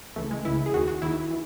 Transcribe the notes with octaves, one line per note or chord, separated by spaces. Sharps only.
C#2 C#3 E3 A3
G#3
C#2 C#3 E3 E4
G#4
D#2 D#3 F#4
F#4
D#2 D#3 E4
E3